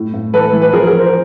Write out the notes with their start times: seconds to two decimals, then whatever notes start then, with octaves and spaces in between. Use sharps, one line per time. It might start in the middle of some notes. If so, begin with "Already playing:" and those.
Already playing: A2
0.14 A2
0.34 E3 A4 B4
0.53 E3
0.62 B4
0.73 F3 G#4 A#4
0.87 G#4 A#4
0.93 F3
0.99 A#4 C5